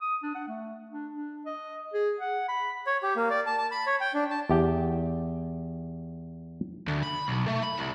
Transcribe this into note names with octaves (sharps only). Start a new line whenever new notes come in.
D#6
D4
F#5
A3
D4
D4
D#5
G#4
F#5
B5
C#5
G4
A#3
D5
A5
A5
B5
C#5
G5
D4
A5
E2 G4 G5
D2
B5
B1
A3
B5
C2